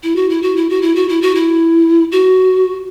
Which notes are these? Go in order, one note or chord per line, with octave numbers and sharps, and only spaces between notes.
E4
F#4
E4
F#4
E4
F#4
E4
F#4
E4
F#4
E4
F#4